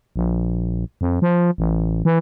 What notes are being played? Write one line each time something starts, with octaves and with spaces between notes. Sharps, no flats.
A#1
F2
F3
A1
E3